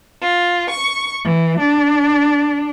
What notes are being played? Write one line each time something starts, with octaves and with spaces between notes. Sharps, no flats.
F4
C#6
E3
D4